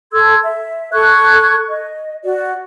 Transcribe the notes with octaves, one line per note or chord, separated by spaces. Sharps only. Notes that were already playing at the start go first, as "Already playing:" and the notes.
A4 C6 E6 G#6
E5
A4 C#6 F#6 G#6
D#5
F#4 D5